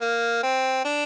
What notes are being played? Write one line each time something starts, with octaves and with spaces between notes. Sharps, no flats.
A#3
C4
D4